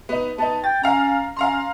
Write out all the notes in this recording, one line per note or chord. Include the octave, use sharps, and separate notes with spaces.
B3 D#4
B3 D#4 A5
G5 A6
C#4 F5 A#5
C#4 F5 A#5 C6